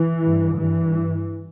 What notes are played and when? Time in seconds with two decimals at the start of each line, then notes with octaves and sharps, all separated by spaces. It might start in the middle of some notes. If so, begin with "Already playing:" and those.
Already playing: E3
0.21 G2
0.57 G2 E3